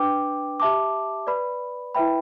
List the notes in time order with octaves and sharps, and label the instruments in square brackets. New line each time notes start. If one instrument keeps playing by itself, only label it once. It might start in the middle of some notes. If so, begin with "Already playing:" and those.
Already playing: [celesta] D4 B4 G5 D6
G4 E5 A5 D6
B4 D5 B5
E4 B4 E5 G5 B5